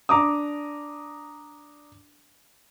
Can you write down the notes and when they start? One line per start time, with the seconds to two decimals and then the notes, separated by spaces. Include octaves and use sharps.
0.09 D4 A#5 D6 D#6